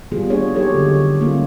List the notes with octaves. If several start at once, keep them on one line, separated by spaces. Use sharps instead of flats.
D#3 G3 B3 F4 G#4
A#3 D4 F4 G#4 C#5
F#3 D#4 G4 A4 C#5
D3 D#3
G3 A3 A#3 C#4 F4